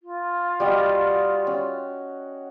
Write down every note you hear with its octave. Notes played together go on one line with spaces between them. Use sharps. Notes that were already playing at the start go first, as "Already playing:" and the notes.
F4
G3 F#4 D#5
C#4